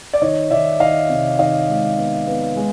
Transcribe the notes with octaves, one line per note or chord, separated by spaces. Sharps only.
D5
D#3 C#5 D#5
D#3 D5 E5
D#3 D#5 F5
C3
D#3 D#5 F5
G#3
B3
B3
G#3